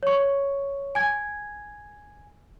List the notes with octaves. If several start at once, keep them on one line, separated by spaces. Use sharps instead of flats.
C#5 C#6
G#5 G#6